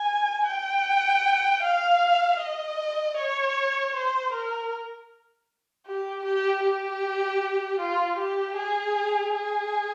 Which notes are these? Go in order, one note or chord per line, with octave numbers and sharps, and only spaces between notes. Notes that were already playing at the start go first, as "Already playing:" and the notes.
Already playing: G#5
G5
F5
D#5
C#5
C5
A#4
G4
G4
G4
F4
G4
G#4
G#4